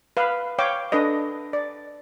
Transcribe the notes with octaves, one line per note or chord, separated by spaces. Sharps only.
B4 F5 B5
C#5 F5 G5 D6
D4 A4 B4 D#5
D5